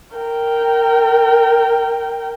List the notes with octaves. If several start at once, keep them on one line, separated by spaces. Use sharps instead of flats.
A#4 G5